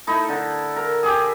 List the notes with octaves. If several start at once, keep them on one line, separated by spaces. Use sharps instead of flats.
A3 D#4 E4
D3
A#4
G4 G#4